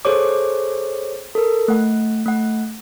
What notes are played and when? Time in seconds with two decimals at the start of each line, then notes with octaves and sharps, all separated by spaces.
0.05 G#4 A4 C5 C#5 D6
1.35 A4 A#4
1.68 A3 F#5
2.26 A3 F#5